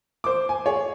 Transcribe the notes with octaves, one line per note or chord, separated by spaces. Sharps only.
C5 D6
G#5
G#4 C#5